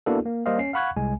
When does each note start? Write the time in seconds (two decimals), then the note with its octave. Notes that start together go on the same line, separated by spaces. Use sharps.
0.06 A#3 B3 D4 E4 F#4 A4
0.25 A#3
0.46 G3 A#3 C5 D#5 F5
0.59 C#4 C7
0.73 F5 F#5 B5 C#6 F#6 G#6
0.97 C2 G#3 G#5